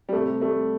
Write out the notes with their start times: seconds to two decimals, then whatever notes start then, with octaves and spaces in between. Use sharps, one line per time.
0.09 G3
0.13 C3 A3
0.42 G3 A3